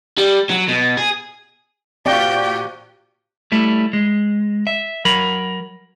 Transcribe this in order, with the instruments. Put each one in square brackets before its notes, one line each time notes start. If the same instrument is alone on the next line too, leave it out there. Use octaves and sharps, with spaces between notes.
[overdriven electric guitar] G3
F#3
B2
G#4
[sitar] A2 F#4 G4 [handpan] C4 F5 [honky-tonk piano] D5 [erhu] G5
[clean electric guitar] G3 A3 E4
G#3
E5
F#3 A#4 B5